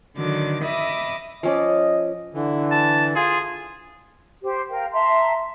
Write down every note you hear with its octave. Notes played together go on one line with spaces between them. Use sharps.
D3 D#3 F#3 D6
D#5 E5 B5 D6 D#6
F3 C#4 D5 D#5
D3 E3
A5
F4 G#4
G4 C5
A#4 F5 G5
E5 A5 A#5 C6